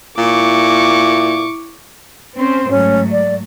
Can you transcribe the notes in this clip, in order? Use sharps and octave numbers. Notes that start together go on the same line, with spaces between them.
A#2 E4 C#6 D6
C4 C#4 C5
G#2 F#3 A3 C#4
D5